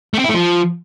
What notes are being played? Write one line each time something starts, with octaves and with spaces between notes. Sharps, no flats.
A3
C4
E4
A3
F3